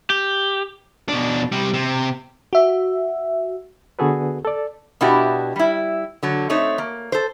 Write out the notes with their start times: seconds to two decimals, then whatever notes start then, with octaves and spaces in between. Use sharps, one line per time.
0.10 G4
1.09 B2 D4
1.52 C3 G3
1.74 C3
2.53 F#4 E5
3.99 D3 B3 F#4 G#4 A4 B4
4.45 A4 D5
5.01 B2 D4 E4 F#4 G4
5.56 G3 E4
6.23 D3 F#3
6.50 A3 C4 D#4 C#5
6.78 A#3
7.12 A4 C5